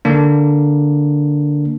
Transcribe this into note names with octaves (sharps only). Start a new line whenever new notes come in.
D3 A#3 D4